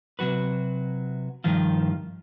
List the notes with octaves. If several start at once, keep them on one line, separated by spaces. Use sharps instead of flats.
C3 F#3 F#4 B4
G2 D#3 F3 F4